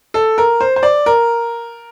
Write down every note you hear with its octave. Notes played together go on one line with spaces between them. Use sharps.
A4
A#4
C5
C5
D5
A#4